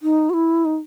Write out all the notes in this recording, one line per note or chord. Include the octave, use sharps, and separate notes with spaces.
D#4
F#4
E4
D#4